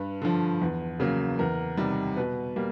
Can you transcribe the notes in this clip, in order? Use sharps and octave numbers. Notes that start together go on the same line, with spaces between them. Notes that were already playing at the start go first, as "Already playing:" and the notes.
Already playing: G2 B4
D3 F3
E2
C#3 F#3 A#3
E2 A#4
C3 D#3 G3
B2 B4
G3 A#3